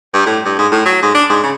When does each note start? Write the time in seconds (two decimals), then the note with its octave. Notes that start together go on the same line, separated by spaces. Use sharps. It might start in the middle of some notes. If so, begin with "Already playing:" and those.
0.14 G2
0.26 A2
0.45 G2
0.59 G#2
0.72 A2
0.86 F#3
1.02 G#2
1.15 D4
1.30 G#2
1.44 C#3